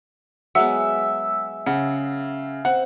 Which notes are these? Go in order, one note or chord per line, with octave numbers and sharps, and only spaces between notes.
F#3 G#3 B3 E5 F#5
C#3 F#5
C4 F#5